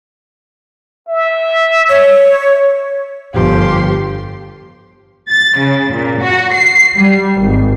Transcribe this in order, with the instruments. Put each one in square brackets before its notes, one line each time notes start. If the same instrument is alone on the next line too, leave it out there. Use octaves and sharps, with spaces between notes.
[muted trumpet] E5
[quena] C#5
[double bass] G1 F3 [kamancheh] G4 C6
[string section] A6
C#3
A#2
F#4
C7
G3
G#1